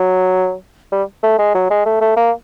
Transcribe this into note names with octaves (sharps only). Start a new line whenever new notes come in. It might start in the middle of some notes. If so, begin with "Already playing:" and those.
Already playing: F#3
G3
A3
G#3
F#3
G#3
A3
A3
A#3